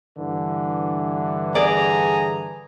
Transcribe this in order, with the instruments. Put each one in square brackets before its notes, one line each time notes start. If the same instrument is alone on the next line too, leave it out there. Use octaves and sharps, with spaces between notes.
[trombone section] G2 D3 E3
[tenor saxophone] G#4 [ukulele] D5 [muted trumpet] A#5